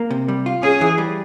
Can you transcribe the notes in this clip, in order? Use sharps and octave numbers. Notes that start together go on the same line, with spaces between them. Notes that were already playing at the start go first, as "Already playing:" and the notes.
Already playing: A#3
C3
G3
F4
C#4 G#4
E3
G3